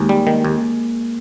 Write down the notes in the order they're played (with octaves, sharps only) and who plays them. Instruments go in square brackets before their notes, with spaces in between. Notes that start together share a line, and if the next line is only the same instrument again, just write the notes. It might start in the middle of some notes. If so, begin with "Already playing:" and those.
Already playing: [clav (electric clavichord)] D#2 [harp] G#3 A#3
[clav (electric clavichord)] G3
D#3
D#2